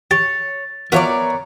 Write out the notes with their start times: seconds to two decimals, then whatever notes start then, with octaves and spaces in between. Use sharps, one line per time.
0.11 G4 C#5 A6
0.92 F3 B3 F#4 A#4 C#5 D5 E5 A#5